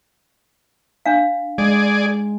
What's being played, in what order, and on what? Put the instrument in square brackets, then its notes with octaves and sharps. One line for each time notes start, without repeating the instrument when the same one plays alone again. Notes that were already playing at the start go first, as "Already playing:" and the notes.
[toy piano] D4 F5
[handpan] G#3 [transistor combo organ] G#4 D5